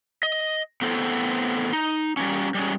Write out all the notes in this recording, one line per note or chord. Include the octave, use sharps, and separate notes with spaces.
D#5
A2 B3 C4 E4 A4 C5
D#4
G3 G#3 A#3 C#4
G3 G#3 C#4